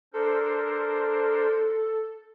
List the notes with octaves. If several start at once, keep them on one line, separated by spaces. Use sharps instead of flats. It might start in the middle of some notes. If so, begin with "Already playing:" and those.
D4 A4 A#4 C5